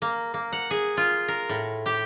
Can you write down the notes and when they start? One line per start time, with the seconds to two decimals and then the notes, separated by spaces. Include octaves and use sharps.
0.02 A#3
0.34 A#3
0.52 F#5
0.71 G#4
0.97 F4
1.28 A#4
1.49 A2
1.86 G4